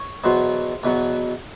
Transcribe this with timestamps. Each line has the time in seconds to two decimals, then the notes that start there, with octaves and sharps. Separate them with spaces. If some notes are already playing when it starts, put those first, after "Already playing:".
Already playing: C#5
0.24 E2 B2 F#3 C5
0.83 E2 B2 F#3